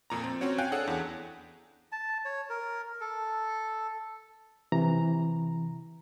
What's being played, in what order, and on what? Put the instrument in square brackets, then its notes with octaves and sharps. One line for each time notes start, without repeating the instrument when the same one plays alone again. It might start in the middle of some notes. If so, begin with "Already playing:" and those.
[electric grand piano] F2 A#2 A#5
C4
C4 C#4 F#4 C#5
F5 G5 G#5 F#6
D4 G#4 A4 C#5 F#5
E2
[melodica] A5
C#5
A#4
A4
[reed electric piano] C3 E3 A#5